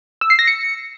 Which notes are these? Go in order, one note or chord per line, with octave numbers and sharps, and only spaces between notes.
E6
C7
A#6
C#7